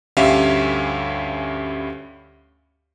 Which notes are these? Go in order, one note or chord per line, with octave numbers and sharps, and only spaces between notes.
D2 G2 C#4 G4 E5 F5